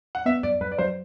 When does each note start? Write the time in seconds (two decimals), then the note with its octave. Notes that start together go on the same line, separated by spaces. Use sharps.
0.15 F#5
0.26 B3 E5
0.43 F#2 D5
0.61 F#2 B4
0.72 D5
0.78 F#3 C5